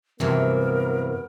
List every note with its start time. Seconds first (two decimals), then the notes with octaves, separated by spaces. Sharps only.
0.20 G2 C3 E3 F#3 B3 A#4